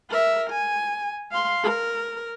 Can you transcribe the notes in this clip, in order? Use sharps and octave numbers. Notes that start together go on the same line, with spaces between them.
A#4 E5
G#5
F5 C6
A#4